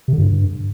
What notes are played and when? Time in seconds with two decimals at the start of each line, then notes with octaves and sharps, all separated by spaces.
0.08 C3
0.13 D3
0.18 G2